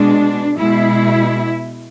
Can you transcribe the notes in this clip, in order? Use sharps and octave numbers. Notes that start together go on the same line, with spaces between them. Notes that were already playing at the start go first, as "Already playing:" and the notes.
Already playing: B2 G#3 D4
B2 G#3 E4